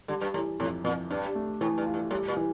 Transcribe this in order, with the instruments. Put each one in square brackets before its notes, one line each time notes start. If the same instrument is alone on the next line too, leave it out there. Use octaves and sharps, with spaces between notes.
[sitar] D3 [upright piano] G3
[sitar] G2
[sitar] A2 [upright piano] E3
[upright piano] F2 [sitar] A2
[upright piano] F2 [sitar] A#2
[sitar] G2 [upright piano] D4
[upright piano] A3
[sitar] A2 [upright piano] E3
[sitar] G2
[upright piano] F4
[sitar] G2
[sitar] A2 [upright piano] G3
[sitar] A#2
[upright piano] E3